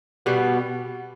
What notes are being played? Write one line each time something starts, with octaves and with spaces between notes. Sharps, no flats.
B2 G3 B3